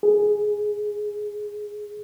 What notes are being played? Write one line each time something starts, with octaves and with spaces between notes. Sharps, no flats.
G#4